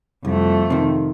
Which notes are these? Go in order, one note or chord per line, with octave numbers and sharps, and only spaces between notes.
C2 F2 A3
C3 D#3